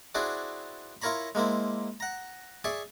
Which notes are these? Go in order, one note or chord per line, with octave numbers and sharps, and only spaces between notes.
C4 D4 E4 F#4 G#4 D5
E4 F4 A#4 C#5 A#5 B5
G#3 A#3 C4 E4
F#5 A#5
G#4 D5 E5 C#6